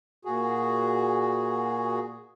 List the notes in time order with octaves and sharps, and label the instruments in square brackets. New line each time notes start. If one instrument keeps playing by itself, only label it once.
[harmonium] A#2 F#4 G#4